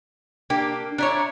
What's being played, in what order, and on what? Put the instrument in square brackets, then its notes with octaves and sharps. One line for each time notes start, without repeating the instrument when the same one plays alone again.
[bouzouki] A#3 G4 [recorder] D4
[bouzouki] D4 E4 C#5 [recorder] A#5